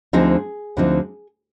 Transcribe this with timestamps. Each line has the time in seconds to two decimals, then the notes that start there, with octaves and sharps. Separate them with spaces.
0.13 D2 D3 F3 C4 D#4 G#4
0.77 D2 D3 F3 C4 D#4